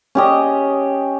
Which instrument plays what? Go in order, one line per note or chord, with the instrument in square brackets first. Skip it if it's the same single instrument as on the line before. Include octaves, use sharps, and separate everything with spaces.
[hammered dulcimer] C#4 G4 D#5